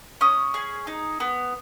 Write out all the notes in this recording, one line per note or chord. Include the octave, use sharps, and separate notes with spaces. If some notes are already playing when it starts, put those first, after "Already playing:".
C#4 D#6
G#4
D#4
B3